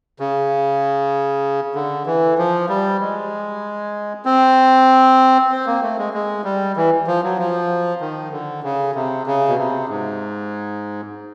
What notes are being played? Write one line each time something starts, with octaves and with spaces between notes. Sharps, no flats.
C#3
D3
E3
F3
G3
G#3
C4
C4
A#3
A3
G#3
G#3
G3
E3
F3
F#3
F3
D#3
D3
C#3
C3
C#3
B2
C3
G#2